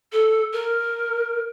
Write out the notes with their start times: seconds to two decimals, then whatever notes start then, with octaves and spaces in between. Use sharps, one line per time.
0.12 A4
0.53 A#4